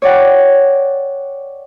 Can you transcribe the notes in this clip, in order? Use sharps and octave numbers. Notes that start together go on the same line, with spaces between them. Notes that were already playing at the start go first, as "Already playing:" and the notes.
C#5 D5 F#5 G5